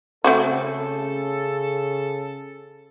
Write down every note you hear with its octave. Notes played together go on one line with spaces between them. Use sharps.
C#3 A3 C4 F#4 A4